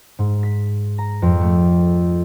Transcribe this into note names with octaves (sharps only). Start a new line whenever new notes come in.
G#2
B6
A#5
F2
A3